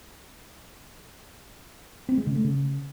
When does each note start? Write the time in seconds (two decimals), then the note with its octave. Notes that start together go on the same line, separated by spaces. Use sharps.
2.09 C4
2.18 G#3
2.27 C#3
2.36 A3
2.45 C#3